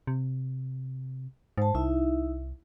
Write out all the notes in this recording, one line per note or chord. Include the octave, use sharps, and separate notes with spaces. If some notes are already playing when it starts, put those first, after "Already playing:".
C3
G#2 C5 A5
C2 D#4 E4 E5